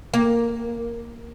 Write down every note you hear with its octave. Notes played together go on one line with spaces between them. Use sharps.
A#3